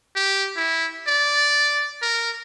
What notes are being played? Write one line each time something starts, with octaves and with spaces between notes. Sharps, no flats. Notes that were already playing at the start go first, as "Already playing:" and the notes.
G4
E4
D5
A#4